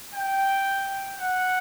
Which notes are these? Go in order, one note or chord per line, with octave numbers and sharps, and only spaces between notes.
G5
F#5